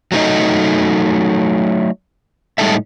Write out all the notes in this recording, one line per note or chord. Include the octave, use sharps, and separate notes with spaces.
F#3 A3 D#4 D#5
A2 G3 G#3 D#4 A4 E5